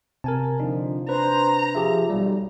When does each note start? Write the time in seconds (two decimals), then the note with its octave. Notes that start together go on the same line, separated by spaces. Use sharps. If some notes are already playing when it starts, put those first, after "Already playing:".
0.24 C3 A#4 G#5 A5
0.60 D3 F3 D4 D#4
1.09 D4 B4 C5 A#5
1.75 F3 G4 G#4 E5
2.10 B1 G3